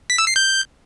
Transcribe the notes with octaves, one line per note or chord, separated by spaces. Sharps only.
B6
E6
C7
G6